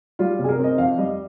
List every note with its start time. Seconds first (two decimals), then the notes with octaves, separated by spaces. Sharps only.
0.19 G3 F4
0.39 C3
0.44 G#4
0.49 A#4
0.59 C4 D#5
0.78 F2 F5
0.98 G3 D#5